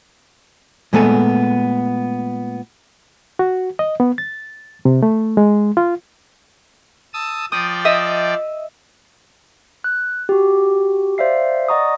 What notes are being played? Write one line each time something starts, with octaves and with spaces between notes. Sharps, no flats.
A#2 G#3 A3 B3 A4 G#5
F#4
D#5
B3
A6
C3
A3
G#3
F4
A5 D#6 E6
F3 D5 G5 D#6
D#5 E5 D#6
F#6
F#4 G4
C5 D5 E5 F5 C7
D5 D#5 F#5 A#5 C#6 D#6